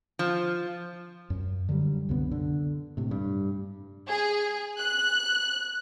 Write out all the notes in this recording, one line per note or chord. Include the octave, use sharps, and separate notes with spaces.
F3
F#2
D3 F#3 G3
C2 F#2 D3 B3
D3
A2 C3
G2
G#4
F#6